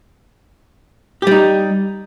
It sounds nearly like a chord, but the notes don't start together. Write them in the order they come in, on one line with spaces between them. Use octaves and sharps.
G4 G3 D#4